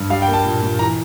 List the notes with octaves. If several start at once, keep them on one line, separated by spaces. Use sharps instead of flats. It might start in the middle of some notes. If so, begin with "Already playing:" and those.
Already playing: G2
G3 F5
G5
A#3
A5
A#2
A#2
E3 A#5